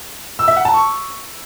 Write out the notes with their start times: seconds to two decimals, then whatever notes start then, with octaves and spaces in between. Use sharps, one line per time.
0.39 E6
0.48 E5
0.56 F#5
0.65 A5
0.74 C#6